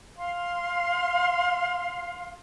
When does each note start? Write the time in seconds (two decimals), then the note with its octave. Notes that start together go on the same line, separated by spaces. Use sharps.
0.17 F5 C6